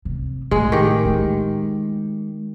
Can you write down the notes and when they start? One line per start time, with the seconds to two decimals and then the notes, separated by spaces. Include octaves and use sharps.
0.05 C3
0.51 A2 G#3
0.72 D#3 G4
1.05 G#3